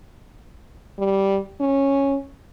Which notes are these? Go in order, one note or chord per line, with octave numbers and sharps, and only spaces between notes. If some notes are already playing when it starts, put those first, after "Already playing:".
G3
C#4